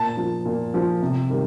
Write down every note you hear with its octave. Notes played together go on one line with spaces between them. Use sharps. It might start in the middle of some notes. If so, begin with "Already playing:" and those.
Already playing: A#2 A5
F3
A#2
F3
C3
D#3 G3